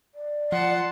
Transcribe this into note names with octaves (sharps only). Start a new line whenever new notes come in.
D5
F3 F#5 A5 C6